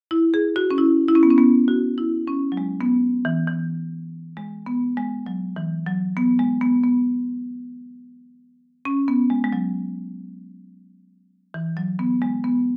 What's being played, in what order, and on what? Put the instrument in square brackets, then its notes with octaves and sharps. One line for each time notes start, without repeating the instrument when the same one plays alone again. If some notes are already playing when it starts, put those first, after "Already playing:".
[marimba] E4
G#4
F#4
C#4
E4
E4
C#4
B3
C#4
B3
F#4
E4
C#4
F#3
G#3
B3
E3
E3
G#3
B3
G#3
F#3
E3
F#3
B3
G#3
B3
B3
C#4
B3
G#3
G#3
F#3
E3
F#3
B3
G#3
B3